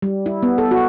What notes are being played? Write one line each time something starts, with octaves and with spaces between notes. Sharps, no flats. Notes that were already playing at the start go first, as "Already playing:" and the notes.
G3
E4
B3
A4
F#4